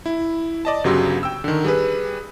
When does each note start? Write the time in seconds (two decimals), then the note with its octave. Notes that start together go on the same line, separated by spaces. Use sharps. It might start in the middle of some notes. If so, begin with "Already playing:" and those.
0.06 E4
0.65 D5 D#5 A5
0.84 G1 C#3 F#3 G4 C6 E6
1.23 G5 E6
1.44 D3 D#3
1.64 G3 G#4 B4